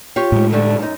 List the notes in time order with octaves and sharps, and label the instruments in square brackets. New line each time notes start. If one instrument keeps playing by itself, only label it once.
[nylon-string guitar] F4 G4 C#5
[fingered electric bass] A2 G#3
[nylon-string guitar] D3 G3 A3
F#2 D#4